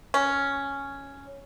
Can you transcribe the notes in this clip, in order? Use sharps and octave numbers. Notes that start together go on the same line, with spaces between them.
C#4